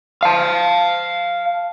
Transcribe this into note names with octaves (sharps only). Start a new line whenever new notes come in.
F5 A5